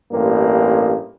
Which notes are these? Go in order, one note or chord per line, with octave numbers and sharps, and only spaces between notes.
A1 G2 A#3